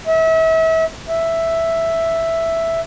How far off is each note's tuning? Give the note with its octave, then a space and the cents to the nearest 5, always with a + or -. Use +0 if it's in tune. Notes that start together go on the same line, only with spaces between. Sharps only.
E5 -35
E5 +0